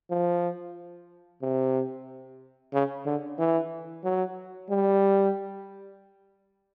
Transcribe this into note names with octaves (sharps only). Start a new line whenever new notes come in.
F3
C3
C#3
D3
E3
F#3
G3